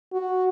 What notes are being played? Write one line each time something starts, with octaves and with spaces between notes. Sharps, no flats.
F#4